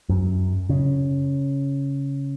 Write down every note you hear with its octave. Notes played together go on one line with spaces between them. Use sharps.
F#2
C#3